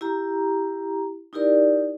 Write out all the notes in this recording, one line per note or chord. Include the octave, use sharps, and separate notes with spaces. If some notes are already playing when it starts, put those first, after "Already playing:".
E4 G4 A#5
D#4 E4 G4 A#4 D5